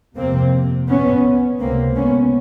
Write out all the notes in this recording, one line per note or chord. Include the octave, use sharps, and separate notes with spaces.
F2 C3 A#3 C4
B3 C#4
C#2 C3 A#3 C4
B3 C#4